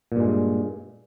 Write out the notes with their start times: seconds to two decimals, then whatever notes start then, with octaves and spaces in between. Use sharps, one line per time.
0.12 A#2
0.16 G2
0.21 G#3